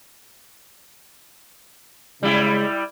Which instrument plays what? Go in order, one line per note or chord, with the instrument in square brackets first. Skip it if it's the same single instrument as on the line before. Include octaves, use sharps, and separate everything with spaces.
[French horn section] C#3 G#3 [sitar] G3 E4